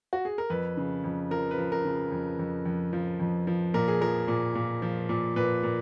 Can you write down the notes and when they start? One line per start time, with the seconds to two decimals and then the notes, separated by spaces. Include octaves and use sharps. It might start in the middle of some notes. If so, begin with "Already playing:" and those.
0.13 F#4
0.25 G#4
0.38 A#4
0.50 F2 B4
0.77 C#3
1.04 F2
1.31 F3 A#4
1.51 B4
1.58 F3
1.72 A#4
1.85 C#3
2.12 F2
2.39 F2
2.65 F2
2.93 F3
3.20 F2
3.47 F3
3.74 A#2 A#4
3.88 G#4
4.01 F3 A#4
4.28 A#2
4.55 A#2
4.82 F3
5.09 A#2
5.36 A#2 B4
5.63 A#2